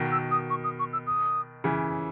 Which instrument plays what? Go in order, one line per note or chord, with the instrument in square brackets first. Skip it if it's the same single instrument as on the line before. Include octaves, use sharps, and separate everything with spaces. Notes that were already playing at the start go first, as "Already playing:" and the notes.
Already playing: [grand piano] B2 D#3
[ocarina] E6
D#6
C#6
D#6
C#6
E6
D#6
[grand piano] C#3 E3